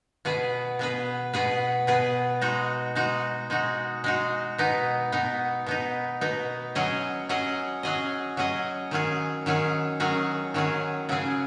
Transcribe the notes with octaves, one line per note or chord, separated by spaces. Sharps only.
B2 B3 G#4 B4
B2 B3 G#4 B4
B2 B3 G#4 B4
B2 B3 G#4 B4
G#3 D#4 F#4
G#3 D#4 F#4
G#3 D#4 F#4
G#3 D#4 F#4
B2 B3 D#4
B2 B3 D#4
B2 B3 D#4
B2 B3 D#4
F#3 C#4 G#4 D#5
F#3 C#4 G#4 D#5
F#3 C#4 G#4 D#5
F#3 C#4 G#4 D#5
D#3 F#3 C#4 G#4
D#3 F#3 C#4 G#4
D#3 F#3 C#4 G#4
D#3 F#3 C#4 G#4
C#3 F#3 C#4 G#4